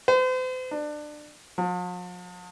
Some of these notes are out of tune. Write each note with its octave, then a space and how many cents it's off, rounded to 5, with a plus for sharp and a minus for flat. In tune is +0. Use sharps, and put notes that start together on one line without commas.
C5 -40
D4 +25
F3 +45